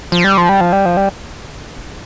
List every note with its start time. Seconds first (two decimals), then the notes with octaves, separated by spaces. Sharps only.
0.12 F3
0.24 G3
0.37 F3
0.49 G3
0.60 F3
0.72 G3
0.86 F3
0.97 G3